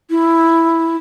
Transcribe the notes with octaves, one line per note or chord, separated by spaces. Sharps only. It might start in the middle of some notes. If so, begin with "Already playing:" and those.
E4